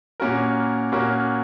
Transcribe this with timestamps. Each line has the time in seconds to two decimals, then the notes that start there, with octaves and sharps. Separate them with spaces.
0.20 A#2 A#3 C#4 F#4 A#4
0.92 A#2 A#3 C#4 F#4 A#4